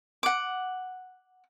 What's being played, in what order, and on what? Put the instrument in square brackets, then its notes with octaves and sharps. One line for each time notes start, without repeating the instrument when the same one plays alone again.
[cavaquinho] F#5 D6